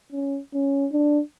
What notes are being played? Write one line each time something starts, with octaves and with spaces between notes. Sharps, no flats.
C#4
C#4
D4